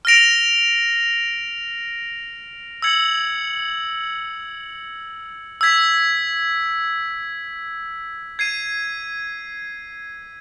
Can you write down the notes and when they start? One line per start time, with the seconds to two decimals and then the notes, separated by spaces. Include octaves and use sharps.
0.05 F6 A#6 D7 F7
2.82 E6 G#6 C#7 F#7
5.61 E6 G#6 B6
8.39 G#6 C7 D#7